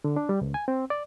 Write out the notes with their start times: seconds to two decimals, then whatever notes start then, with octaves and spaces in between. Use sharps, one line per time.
0.04 D3
0.16 D4
0.29 G3
0.41 C#2
0.54 G#5
0.68 C4
0.90 D5